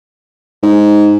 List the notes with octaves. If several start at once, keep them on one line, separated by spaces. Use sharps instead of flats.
G#2